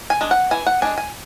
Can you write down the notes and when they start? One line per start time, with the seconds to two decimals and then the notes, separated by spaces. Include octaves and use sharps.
0.10 G#5
0.21 G#3 D4
0.31 F#5
0.51 E3 G#5
0.66 F#5
0.82 G#3 D4 G#5
0.98 G#5